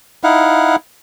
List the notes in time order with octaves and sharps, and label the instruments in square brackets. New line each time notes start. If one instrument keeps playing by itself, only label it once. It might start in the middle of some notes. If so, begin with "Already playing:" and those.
[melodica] D#4 E4 F5 F#5